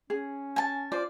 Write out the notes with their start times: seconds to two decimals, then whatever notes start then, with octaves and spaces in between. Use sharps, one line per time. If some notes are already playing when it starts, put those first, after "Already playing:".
0.10 C#4 G#4
0.56 G#5 A5
0.92 F4 C5 D5